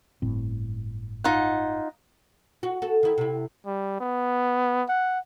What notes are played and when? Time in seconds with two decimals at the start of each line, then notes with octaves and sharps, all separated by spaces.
0.22 G1 A2 C4
1.24 D#4 F4 F#5
2.63 F#4
2.82 F#4 A4
3.03 D#3 E4
3.18 C3 E4
3.66 G3
4.00 B3
4.89 F#5